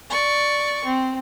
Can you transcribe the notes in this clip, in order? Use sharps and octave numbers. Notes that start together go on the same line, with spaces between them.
D5 C#6
C4